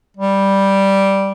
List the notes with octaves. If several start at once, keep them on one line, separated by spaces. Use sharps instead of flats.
G3